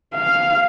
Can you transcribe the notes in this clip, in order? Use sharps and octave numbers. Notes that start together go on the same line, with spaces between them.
F5